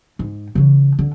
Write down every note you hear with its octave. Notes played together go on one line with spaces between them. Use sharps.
G#2
C#3 E3
D3